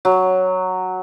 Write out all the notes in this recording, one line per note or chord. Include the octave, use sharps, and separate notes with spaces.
F#3